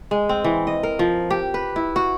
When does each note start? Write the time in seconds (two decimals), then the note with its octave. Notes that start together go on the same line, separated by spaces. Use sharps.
0.11 G#3
0.29 C4
0.44 E3
0.67 D#5
0.83 A#4
0.99 F3
1.30 G4
1.54 B4
1.76 E4
1.96 F#4